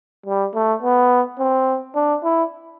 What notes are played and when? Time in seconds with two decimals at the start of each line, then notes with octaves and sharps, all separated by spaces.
0.26 G3
0.55 A3
0.83 B3
1.39 C4
1.95 D4
2.24 E4